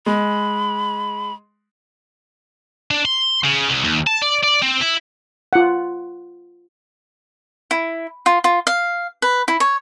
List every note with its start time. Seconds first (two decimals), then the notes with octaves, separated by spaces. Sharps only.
0.06 G#3 B5
2.91 D4
3.05 C6
3.44 C#3
3.69 C2
3.84 D#2
4.07 A5
4.22 D5
4.43 D5
4.62 C4
4.81 E4
5.53 F4 F#5
7.71 E4
8.26 F4
8.44 F4
8.67 F5
9.22 B4
9.48 E4
9.60 C#5